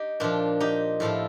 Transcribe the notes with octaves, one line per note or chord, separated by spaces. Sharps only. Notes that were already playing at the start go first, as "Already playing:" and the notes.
Already playing: D#4 G4
A#2 F3 D4 F4
D#4 G4
A2 F3 F4 A4